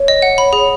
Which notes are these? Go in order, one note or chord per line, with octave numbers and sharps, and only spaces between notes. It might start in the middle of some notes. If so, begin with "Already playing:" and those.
Already playing: C#5
D#5
F#5
B5
G#4